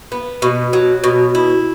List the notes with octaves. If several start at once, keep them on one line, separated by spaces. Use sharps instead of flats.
B3
B2
F#3
B2
E4